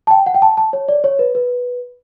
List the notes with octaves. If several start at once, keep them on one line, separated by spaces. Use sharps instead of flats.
A5
G5
F#5
G5
A5
A5
C#5
D5
C#5
B4
B4